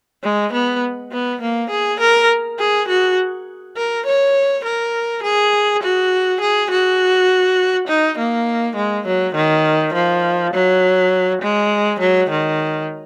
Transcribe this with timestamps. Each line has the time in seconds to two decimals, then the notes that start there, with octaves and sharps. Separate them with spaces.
0.23 G#3
0.53 B3
1.12 B3
1.41 A#3
1.70 G#4
2.00 A#4
2.59 G#4
2.88 F#4
3.77 A#4
4.06 C#5
4.65 A#4
5.23 G#4
5.83 F#4
6.40 G#4
6.70 F#4
7.88 D#4
8.18 A#3
8.76 G#3
9.06 F#3
9.35 D#3
9.93 F3
10.53 F#3
11.42 G#3
12.00 F#3
12.30 D#3